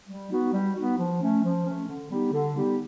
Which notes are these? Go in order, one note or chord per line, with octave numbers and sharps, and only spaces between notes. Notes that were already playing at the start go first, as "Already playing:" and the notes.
G3
B3 D#4 F#4
G3
B3 D#4 F#4
F3
A3 C#4
F3
A3 C#4
D3
G3 B3 D#4 G4
D3
G3 B3 D#4 G4